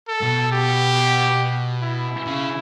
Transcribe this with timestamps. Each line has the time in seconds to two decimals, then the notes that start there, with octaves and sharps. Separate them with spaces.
0.08 A4
0.22 B2
0.52 G4
1.83 E4
2.27 C#3